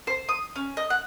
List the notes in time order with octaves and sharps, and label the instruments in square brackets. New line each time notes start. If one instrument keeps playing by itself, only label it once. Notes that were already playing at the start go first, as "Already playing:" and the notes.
[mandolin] C5
D#6
C#4
D#5
F#5